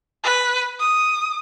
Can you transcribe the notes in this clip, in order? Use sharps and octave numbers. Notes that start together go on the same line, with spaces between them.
B4
D#6